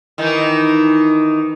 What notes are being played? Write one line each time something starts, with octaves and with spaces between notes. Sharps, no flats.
D#3 E3 D#4